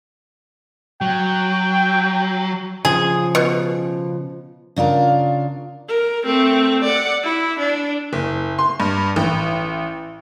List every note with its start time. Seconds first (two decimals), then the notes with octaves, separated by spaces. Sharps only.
1.01 F#3 G5
2.85 C#3 F3 G#4
3.35 B2
4.76 C#3 D4 F4 A#4
5.89 A#4
6.24 A3 C4
6.84 D5 F#5
7.23 E4
7.60 D4
8.13 F#1
8.59 C6
8.80 G2
9.16 A1